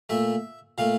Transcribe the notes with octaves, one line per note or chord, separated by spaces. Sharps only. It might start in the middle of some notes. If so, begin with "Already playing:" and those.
A#2 A3 E5
A#2 A3 F5